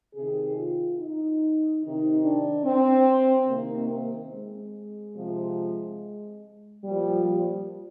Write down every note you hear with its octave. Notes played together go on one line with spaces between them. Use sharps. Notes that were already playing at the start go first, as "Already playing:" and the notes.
C3 D#3 G#4
F4
D#4
C3 D#3 D#4
D4
C4
C3 D#3 A#3
C4
G#3
C3 F3
A#2 F3 G3
G3